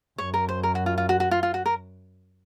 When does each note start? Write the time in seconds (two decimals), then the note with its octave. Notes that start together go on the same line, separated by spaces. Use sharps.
0.18 F#2 C#5
0.34 A#4
0.49 C5
0.63 A#4
0.75 F#4
0.86 F4
0.98 F4
1.09 F#4
1.20 F#4
1.31 F4
1.43 F4
1.54 F#4
1.66 A#4